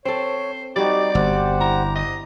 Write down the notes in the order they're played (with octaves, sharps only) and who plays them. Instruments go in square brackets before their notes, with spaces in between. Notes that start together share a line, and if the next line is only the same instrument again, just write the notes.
[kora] C4 A4 [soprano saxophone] C5 [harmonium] C#5
[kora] G3 F#4 [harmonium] D#4 G4 [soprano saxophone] D5
[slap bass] G1 [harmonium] G4 C5 F#5
[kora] E4 [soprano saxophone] A#5
[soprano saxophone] D#5